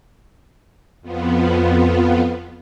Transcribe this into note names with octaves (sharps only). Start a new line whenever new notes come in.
F2 F3 B3